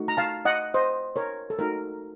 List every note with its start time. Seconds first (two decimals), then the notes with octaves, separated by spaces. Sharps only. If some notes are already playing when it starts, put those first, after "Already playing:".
Already playing: A3 D#4 F#4
0.08 A#5
0.17 F5 A5
0.45 D#5 F#5
0.74 C5 D#5
1.16 A#4 C#5
1.50 A4
1.59 A3 D#4 F#4 A#4